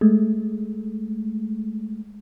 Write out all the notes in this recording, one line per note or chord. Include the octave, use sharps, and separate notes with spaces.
G#3 A3